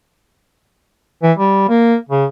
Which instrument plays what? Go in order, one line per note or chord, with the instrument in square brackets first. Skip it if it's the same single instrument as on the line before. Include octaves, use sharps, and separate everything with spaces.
[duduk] E3
G3
A#3
C#3